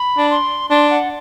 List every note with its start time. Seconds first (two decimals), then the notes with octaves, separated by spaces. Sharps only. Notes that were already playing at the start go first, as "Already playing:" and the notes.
Already playing: B5
0.18 D4
0.31 C6
0.70 D4 C6
0.90 F#5